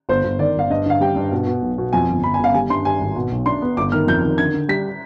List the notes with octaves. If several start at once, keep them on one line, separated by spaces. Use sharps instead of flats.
G1 C5
G1
D#3 D5
G1 F5
G2 D#5
D3 F5
G3 G5
G2
B2
B2
B1
B2
F2 G#5
G1
G1 B5
G#5
G1 F5
G3 G#5
G2 C6
G3 G#5
G#1
B2
B1
D4 C6
B3
G1 D6
D#3 F6
F2 G6
D#3
D3 G#6
D3
G3 B6